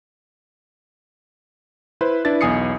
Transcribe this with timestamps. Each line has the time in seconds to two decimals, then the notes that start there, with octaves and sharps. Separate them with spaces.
2.01 E4 B4 C5
2.25 D4 E4 B4 A6
2.41 B1 E2 G#5 D#6 C7 C#7